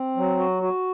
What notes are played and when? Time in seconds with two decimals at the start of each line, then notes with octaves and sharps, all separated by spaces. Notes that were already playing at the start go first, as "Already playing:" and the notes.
Already playing: C4
0.16 F#3
0.39 F#4
0.63 F#4